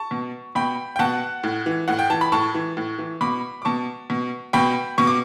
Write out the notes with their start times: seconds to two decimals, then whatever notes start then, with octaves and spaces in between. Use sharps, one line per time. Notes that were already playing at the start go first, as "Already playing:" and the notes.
Already playing: A5 C#6
0.11 B2
0.55 B2 G5 B5
0.96 G5
0.99 B2 F#5 A5
1.43 A2
1.66 E3
1.88 A2 F#5
1.99 G5
2.10 E3 A5
2.21 B5
2.32 A2 A5 C#6
2.55 E3
2.77 A2
2.99 E3
3.21 B2 B5 D6
3.62 D6
3.65 B2 A5 C#6
4.10 B2
4.53 B2 G5 B5
4.98 B2 C#6
5.07 D6